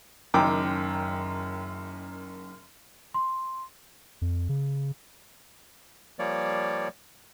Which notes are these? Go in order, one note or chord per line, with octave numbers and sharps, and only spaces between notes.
F#1 F#2 D#3 G5 D6
C6
F2
C#3
F3 G3 A#3 C#5 D5